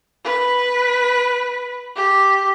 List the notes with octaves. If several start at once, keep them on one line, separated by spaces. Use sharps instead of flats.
B4
G4